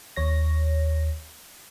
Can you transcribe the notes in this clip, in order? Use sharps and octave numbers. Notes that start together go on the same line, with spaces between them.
D#2 C#5 A#6